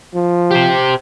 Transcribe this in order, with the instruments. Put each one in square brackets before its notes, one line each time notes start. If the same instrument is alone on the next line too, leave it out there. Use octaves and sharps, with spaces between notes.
[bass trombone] F3
[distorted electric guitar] G4 C5